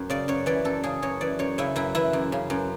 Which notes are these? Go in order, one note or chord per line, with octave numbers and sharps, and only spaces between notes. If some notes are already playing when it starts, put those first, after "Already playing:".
Already playing: F#2
C#3 D5
F#2 C#5
E3 D5
F#2 A4
C#3 G#4
F#2 C#5
E3 D5
F#2 C#5
C#3 E4
F#2 E4
E3 E4
F#2
C#3
F#2